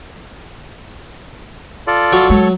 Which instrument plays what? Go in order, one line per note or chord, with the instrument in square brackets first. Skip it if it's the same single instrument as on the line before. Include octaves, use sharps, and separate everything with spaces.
[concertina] F4 A4 D5
[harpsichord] F#3
[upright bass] G#3 [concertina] A4 C#5